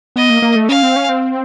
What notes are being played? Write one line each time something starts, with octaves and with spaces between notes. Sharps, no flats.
B3 D#5
A#3
A#3
A3
C#4 F5
C4
C#4
C4